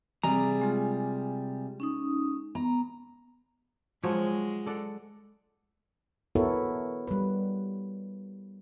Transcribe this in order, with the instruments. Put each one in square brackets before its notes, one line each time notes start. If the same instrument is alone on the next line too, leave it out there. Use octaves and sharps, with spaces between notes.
[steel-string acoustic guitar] C3 G3 G#4 [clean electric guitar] A#5
[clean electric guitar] G#3 F4
[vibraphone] C#4 D#4 D#6
[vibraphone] B3 [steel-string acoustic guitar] A#5
[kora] F3 F#3 C#5 [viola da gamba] G#3
[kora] A4 D5 F#5
[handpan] B3 E4 F#4 A4 A#4 C#5
G3 B4